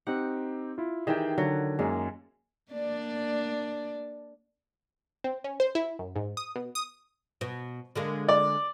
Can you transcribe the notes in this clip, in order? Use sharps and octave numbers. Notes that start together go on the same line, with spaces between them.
C4 D#4 G4 F#5
E4 F4
D#3 E3 G4 G#4 G5
D3 F#3
F#2 G#3 A#3
A#3 D4 D5
C4
C#4
C5
E4
F#2
G#2
D#6
B2
D#6
B2
D3 G#3 A#3
D5